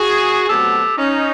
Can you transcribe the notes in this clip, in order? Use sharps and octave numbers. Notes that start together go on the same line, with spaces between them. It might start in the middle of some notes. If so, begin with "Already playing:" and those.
Already playing: F#4 G#4
B2 F#3 A3 C4 G4 A4
C#4 D#4